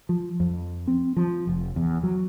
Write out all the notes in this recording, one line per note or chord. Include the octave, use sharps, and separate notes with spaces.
F3
F2
C4
F3
F1
E2
F#3